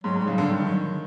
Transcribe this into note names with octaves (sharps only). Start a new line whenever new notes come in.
G#2 F#3
G#2 G3
C#3 F#3
D3
D#3 G3
F#3